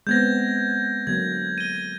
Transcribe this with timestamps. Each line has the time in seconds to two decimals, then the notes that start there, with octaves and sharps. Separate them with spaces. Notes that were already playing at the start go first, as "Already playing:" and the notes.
0.07 G#3 B3 C4 G6 G#6 A#6
1.07 D3 F#3 A#3 G#6
1.58 D#7 G7